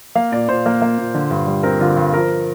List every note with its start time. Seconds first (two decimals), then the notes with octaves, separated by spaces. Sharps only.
0.15 A#3 F5
0.32 A#2 D5
0.49 A#2 C5
0.66 A#3
0.82 A#3
0.98 A#2
1.14 D3
1.31 G2
1.47 G3
1.63 C4 A#4
1.80 D3 F4
1.97 G2
2.14 F3 A#4